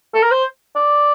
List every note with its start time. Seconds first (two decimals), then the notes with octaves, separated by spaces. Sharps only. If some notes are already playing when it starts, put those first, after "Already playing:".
0.14 A4
0.23 A#4
0.31 C5
0.76 D5